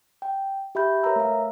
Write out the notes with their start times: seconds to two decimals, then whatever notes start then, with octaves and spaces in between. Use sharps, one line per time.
0.22 G5
0.75 G4 E5 B5 G6
1.03 A#4 B4 C#5 E5 A#5 E6
1.16 A3 F5